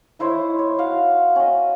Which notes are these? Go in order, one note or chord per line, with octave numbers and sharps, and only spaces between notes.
D#4 E4 C5 C#5
C#5
F#4 E5 F5
C#4 D#5